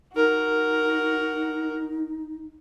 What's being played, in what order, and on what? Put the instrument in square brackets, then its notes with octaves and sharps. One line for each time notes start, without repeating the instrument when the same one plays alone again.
[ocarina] D#4 [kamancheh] F#4 A#4